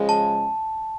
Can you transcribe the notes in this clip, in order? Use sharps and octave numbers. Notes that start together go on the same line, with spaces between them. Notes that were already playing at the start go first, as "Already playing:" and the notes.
Already playing: C#3 F3 G#3
A5